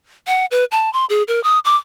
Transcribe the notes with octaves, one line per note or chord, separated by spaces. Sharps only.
F#5
B4
A5
C6
G#4
A#4
D#6
D6